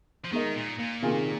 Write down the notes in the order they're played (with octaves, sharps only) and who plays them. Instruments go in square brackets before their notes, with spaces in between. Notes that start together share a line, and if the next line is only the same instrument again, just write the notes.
[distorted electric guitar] F3
[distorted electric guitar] D#3 [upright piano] G#3 D#4 A#4 D#5
[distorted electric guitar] A#2
A#2
[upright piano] C3 D#3 A#3 F4 G#4